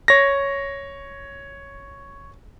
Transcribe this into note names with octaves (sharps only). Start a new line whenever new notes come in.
C#5 A#6